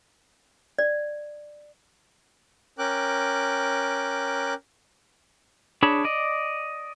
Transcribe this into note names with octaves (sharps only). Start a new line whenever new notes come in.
D5
C#4 A#4 G5 D6 F#6
D4 G#4 C#5 A5 B5
D5 D#5